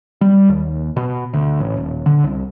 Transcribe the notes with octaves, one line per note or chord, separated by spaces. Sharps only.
G3
D#2
B2
D2
A1
D#1
D3
C2